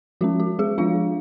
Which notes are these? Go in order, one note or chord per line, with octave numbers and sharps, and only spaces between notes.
F3 G#3 C#4 F#4
F#4
G#3 G#4
F3 G#3 D4 F4 F5